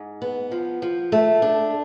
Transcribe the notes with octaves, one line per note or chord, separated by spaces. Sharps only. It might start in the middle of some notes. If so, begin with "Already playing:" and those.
Already playing: G#2
B3
F3
F3
A3
D4